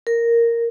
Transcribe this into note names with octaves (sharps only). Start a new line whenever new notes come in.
A#4